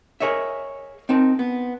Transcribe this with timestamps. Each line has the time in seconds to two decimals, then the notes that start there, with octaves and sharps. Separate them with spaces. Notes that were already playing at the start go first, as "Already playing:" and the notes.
0.20 G#4 A#4 C#5 D#5 E5
1.09 C4 D#4 A#4 A5
1.39 B3